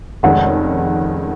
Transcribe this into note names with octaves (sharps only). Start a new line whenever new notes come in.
F1 F2 D#3 G#3 C#4 F#5